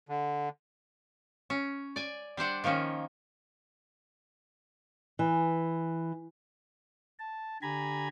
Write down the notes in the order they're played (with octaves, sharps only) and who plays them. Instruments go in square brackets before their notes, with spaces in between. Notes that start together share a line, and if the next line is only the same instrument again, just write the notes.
[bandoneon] D3
[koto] C#4
D5 G#5
G3 D4 C5 F#5
D#3 F3 A#3 C#4
[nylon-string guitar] E3
[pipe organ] A5
D3 G4 G#5 A#5 B5 G#6